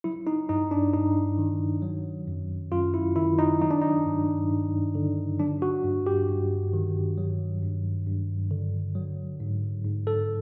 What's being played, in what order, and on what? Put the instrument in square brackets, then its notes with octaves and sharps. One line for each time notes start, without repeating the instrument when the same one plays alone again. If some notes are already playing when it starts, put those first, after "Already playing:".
[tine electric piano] F#3 E4
D#4
G2 D#4
D4
G2 D#4
D#3
F#3
F#2
F#2 F4
E4
D#3 E4
D#4
F#3 D#4
D4
D#4
G2
G2
D3
F#3 D4
F#4
G2
G4
G2
D#3
F#3
G2
G2
D3
F#3
G#2
G#2
A4